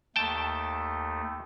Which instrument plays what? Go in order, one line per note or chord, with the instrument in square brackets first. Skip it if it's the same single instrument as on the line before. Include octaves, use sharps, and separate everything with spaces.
[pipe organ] D#2 A3 [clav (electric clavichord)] G5 A5